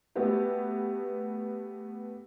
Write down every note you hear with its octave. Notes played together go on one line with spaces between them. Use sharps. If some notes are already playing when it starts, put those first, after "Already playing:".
A3 B3 F#4 G4